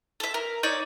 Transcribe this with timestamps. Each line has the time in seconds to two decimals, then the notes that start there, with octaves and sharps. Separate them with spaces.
0.20 A4 E5
0.34 A#4
0.63 D#4 C#5 D5